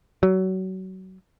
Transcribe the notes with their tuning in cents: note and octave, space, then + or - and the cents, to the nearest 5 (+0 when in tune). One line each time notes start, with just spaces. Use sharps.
F#3 +25